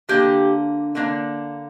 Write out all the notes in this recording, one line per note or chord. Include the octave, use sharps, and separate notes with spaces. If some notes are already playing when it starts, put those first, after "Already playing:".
D3 A#3 D4 G4
D3 A#3 D4